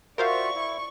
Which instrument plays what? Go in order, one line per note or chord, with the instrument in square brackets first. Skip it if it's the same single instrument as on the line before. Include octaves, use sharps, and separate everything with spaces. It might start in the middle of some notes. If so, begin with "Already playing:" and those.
[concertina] F4 F#4 E5 [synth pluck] A#4 C5 F5 [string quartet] D5 C#6
[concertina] E4